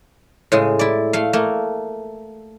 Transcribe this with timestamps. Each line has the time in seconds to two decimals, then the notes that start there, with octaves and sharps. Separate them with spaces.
0.52 A2 C#3 G#3
0.79 E4 D5
1.13 A3 F5
1.33 A3 A#3